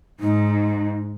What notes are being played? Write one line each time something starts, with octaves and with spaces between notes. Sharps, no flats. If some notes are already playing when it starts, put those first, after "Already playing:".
G#2 D#4